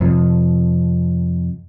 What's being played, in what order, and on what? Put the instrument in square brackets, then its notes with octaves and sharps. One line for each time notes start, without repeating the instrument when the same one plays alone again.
[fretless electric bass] F2 C3 F3